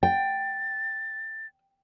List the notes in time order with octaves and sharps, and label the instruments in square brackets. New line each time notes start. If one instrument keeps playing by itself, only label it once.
[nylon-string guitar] G5 [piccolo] A6